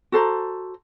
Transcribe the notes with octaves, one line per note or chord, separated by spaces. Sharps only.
F#4 A4 C5 A#5